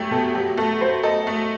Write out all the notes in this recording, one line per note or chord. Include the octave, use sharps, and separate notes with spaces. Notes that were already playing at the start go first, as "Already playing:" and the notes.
Already playing: F#2 A3 G4
B2 A4
F#3 G4
A3 A4
F#3 C5
A4 D#5
A3